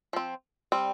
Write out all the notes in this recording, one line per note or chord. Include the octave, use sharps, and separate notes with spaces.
F3 C4
G3 C4